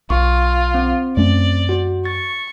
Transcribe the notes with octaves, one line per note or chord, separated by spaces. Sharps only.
B1 B2 F4 C#6
C4
F#2 A3 C#4 D5
F#4
C#6 A6